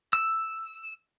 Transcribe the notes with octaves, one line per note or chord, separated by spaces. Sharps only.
E6